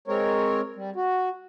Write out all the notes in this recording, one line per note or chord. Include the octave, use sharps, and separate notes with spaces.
G#3 C4 A#4 C#5
G3
F#4